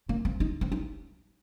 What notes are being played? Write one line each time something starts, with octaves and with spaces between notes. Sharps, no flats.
A#3
C4
D#4
C4
D#4